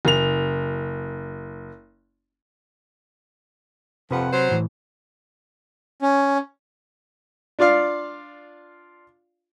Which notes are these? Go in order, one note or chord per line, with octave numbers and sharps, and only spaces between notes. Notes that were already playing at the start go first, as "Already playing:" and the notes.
F#1 F7
F2 C3 F3 B4 F#5
F#3 C5
A2 E3
C#4
D4 F4 D5 F5